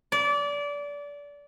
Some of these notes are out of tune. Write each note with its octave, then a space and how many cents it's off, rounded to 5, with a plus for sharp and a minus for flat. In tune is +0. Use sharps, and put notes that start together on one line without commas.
D5 -25